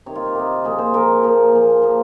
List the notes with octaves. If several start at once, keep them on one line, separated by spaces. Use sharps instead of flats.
C3 D#3 C#5
F4
G4
C3 D#3
A#2 F3 G#4
C5
A#2 F3 A#4
A#2 F3
A#2 F3
A#2 F3